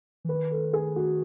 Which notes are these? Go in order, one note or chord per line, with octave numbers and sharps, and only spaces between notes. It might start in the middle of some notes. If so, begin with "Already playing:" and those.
E3
D#3 B4
A4
G#4
F#4